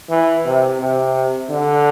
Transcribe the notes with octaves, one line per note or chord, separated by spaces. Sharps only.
E3
C3
C3
D3